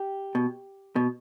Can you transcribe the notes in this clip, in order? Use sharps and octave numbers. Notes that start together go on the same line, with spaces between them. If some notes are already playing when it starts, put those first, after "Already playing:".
Already playing: G4
B2
B2